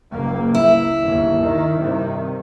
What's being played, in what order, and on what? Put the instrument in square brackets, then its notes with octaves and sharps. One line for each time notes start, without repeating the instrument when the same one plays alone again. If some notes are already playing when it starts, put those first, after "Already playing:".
[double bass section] F#1 C#2 A#3
[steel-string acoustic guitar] E4
[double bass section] G1 D#2
D#3
G2 C3 D#3